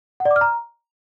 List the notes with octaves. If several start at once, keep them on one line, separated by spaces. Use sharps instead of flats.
F#5
D5
D6
F6
A#5